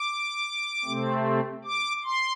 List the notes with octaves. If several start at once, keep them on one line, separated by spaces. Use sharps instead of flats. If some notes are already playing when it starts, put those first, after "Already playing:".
Already playing: D6
C3 A3 C4
D6
C6